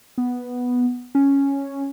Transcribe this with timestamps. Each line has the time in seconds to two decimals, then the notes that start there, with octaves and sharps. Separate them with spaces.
0.18 B3
1.15 C#4